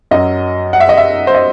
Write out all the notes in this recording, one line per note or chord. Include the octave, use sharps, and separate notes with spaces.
F#2 F#3 D#5
F#5
E5
D#5
E5
C5
D#5